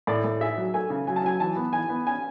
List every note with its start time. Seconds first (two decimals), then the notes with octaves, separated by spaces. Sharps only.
0.07 A2 D5
0.24 A2
0.41 G#4 E5
0.57 F#3
0.74 A3 G#5
0.90 C#3
1.07 F#3 G#5
1.16 A5
1.23 F#3 G#5
1.40 E3 A5
1.56 B3
1.73 E3 G#5
1.89 B3
2.06 C#4 G#5